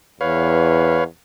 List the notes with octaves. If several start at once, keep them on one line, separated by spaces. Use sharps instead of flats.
E2 B4 C#5 F5